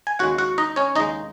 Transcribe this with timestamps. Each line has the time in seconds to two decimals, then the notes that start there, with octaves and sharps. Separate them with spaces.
0.07 G#5
0.19 D#2 C#3 G#3 F#4 F#5
0.38 F#4 F#5
0.58 D#4 D#5
0.76 C#4 C#5
0.96 D#2 C#3 G#3 D#4 D#5